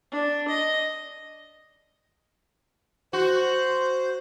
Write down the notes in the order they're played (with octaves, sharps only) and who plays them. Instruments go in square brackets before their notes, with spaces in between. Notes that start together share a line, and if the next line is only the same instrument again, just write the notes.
[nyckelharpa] D4
D#5
[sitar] F#4 [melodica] C5